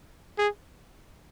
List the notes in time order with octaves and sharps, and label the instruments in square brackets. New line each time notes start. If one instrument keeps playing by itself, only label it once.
[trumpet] G#4